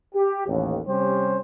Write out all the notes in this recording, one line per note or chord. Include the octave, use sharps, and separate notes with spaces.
G4
A1 D#2
C3 G3 C#4 G4 C5